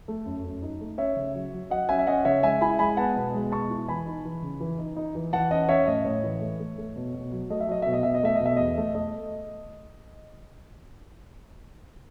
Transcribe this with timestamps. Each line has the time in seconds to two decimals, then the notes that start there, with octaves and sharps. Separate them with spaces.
0.08 A3
0.26 F#2
0.44 F#2
0.62 D#4
0.81 A3
0.98 C#4 C#5 E5
1.16 C#3
1.34 F#3
1.53 F#3
1.70 F#3 D#5 F#5
1.89 C#4 E5 G#5
1.99 E5
2.07 C#4 D#5 F#5
2.25 C#3 C#5 E5
2.43 G#3 E5 G#5
2.61 E4 G#5 B5
2.79 G#3 G#5 B5
2.97 B3 F#5 A5
3.16 B2
3.34 G#3
3.52 B2 A5 C#6
3.70 E4
3.88 E3 G#5 B5
4.06 D#4
4.25 E3
4.42 C#3
4.60 E3
4.79 D#4
4.97 D#4
5.15 E3
5.33 E3 F#5 A5
5.51 C#4 D#5 F#5
5.69 C#4 C#5 E5
5.87 A2 D#5
6.05 A2 C#5
6.24 E3
6.41 A3
6.59 A3
6.78 A3
6.96 B2
7.14 B2
7.32 F#3
7.50 A3 D#5
7.60 E5
7.68 F#3 D#5
7.82 B2 E5
7.93 D#5
8.03 B2 E5
8.14 D#5
8.23 A3 E5
8.35 D#5
8.40 B2
8.46 E5
8.57 E2 D#5
8.77 A3
8.95 A3 D#5